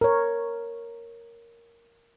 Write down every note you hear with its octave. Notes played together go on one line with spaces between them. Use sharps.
A#4 C#5